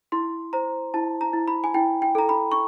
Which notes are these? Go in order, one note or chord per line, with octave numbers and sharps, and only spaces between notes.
E4 C6
C5 A#5
E4 A5
A#5
E4
B5
G#5
E4 G5
G5
A4 A#5
B5
C#6